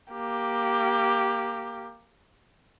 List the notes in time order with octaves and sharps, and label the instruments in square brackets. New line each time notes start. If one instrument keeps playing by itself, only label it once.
[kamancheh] A#3 G4